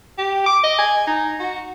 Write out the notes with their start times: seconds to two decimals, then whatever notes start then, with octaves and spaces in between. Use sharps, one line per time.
0.18 G4
0.46 D6
0.64 D#5
0.79 G#5
1.07 D#4
1.40 F#4